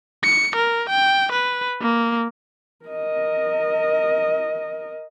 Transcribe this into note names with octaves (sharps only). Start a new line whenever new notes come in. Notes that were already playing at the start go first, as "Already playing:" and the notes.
C#7
A#4
G5
B4
A#3
A#4 D#5